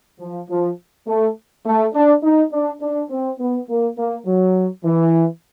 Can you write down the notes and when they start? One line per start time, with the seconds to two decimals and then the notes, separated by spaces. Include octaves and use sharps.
0.20 F3
0.50 F3
1.08 A3
1.65 A3
1.94 D4
2.23 D#4
2.52 D4
2.82 D4
3.11 C4
3.39 B3
3.69 A#3
3.97 A#3
4.26 F#3
4.85 E3